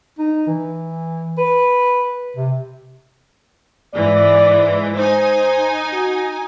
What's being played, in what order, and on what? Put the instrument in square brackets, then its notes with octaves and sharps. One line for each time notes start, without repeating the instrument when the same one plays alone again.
[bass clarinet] D#4
E3
B4
C3
[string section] G#2 E3 [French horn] D5
[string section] D#4 G#5 [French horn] C5
[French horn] F#4